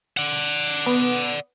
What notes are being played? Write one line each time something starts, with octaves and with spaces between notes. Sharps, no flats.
D5 F#5
B3